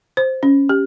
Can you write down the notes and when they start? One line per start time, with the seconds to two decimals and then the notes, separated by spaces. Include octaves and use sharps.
0.17 C5
0.43 C#4
0.69 G4